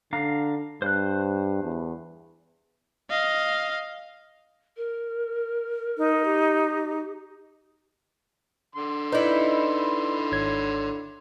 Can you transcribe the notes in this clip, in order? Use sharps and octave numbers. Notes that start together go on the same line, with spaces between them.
D3 D4 F5 A#5
G2 C5 F#6
E2
D#5 F5
A#4
D#4
G4
D3 C6
D#4 E4 B4 D5
G#1 C#5 G#6